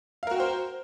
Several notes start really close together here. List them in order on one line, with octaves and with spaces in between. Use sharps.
F5 A#4 F#4 G5 C5